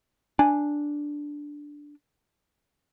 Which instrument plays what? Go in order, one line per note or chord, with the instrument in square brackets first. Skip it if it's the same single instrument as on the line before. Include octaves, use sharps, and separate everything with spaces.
[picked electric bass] D4 [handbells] G#5